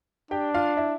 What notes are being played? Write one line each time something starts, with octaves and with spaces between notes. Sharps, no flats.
D4 G4 G5
F4 F5
E4 E5